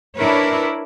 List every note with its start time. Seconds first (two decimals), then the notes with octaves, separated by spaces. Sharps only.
0.16 D4 E4 A#4 B4 C#5